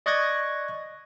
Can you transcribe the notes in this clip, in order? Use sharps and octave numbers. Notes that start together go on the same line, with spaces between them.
D5 D#5 C#6 F#6 G#6 A#6